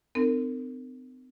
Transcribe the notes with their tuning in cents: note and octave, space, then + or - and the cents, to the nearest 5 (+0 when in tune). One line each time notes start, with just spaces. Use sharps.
C4 -40 D#4 -45 A#4 -35